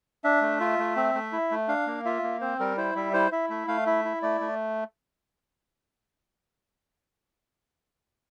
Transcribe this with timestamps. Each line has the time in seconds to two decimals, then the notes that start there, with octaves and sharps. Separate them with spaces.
0.24 D4 E5
0.41 A3
0.60 F4
0.79 A3
0.96 C4
1.15 A3
1.33 E4
1.51 A3
1.68 D4 F5
1.87 A#3
2.05 F4 E5
2.23 A#3
2.41 C4 C5
2.60 G3 A#4
2.77 E4 C5
2.95 G3 E5
3.13 E4 C5
3.32 E4 E5
3.50 A3 E5
3.68 A3 F5
3.86 E4 E5
4.05 E4
4.22 A3 D5
4.41 A3